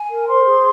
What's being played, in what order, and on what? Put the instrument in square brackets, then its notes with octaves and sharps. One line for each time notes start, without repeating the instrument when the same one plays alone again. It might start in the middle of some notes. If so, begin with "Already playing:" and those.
Already playing: [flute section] G#5
A#4
C5 C6
G#4